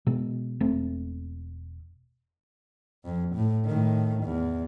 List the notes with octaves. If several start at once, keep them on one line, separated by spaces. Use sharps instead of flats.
B2 G#3
E1 A3 C4
F2
A2
A2 D#3
E2